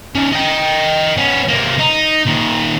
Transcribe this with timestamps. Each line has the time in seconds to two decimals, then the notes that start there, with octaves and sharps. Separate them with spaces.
0.15 D#3 C#4
0.33 D#5 G5
1.17 B3 C#4
1.48 C3 A#3
1.79 D#4
2.26 A#2 D#3